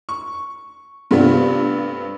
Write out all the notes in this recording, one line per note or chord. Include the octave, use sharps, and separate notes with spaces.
C#6
G2 C3 A3 B3 D4 F4